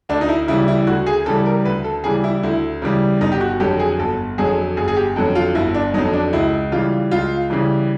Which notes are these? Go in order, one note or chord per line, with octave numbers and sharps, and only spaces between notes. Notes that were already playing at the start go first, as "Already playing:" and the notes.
D2 D4
D#4
E4
C#3 E3 G3 E4
E4
D2 F#4
G#4
C#3 E3 G3 A4
A#4
D2 B4
A4
C#3 E3 G3 G#4
E4
D2 E4
C#3 E3 G3
G1 D#4
G4
F#4
F2 D3 F#3 G4
G#4
G1 A4
F2 D3 F#3 G#4
G1 G#4
G#4
G4
F2 D3 F#3
F4
G1 E4
D4
F2 D3 F#3 D#4
D4
C#2 E4
C#3 E3 G3 F4
C#2 F4
C#3 E3 G3